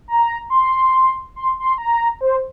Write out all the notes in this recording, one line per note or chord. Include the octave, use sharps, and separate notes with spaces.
A#5
C6
C6
C6
A#5
C5